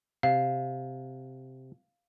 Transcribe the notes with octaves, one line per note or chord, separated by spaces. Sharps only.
C3 F5